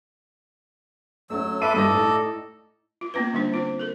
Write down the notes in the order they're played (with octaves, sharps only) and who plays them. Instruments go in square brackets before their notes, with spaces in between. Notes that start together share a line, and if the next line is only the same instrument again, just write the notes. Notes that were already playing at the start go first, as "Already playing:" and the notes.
[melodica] F#3 E6 [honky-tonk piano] A3 C#4
[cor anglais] A4 [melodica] B4 B5 D6 [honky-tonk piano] E5 C6 D#7
[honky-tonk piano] G2 G3 A#6 [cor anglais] A4 [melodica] D5 D#5
[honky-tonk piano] A2 A3 D#4
[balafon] F4
A#3 B3 C#4 F4 B4
D3 G3 A#3 D4 C5
C4 F4 C5
A4 A#4